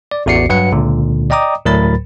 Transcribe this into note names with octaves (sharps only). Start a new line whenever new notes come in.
D5
A1 E2 F#4 D5 C7 C#7
G2 F#3 B4 F#5 C#7
C#2 A#2 D3
D5 D#5 G5 A#5 D6 D#6
D2 A2 F#3 A#4 B5 A6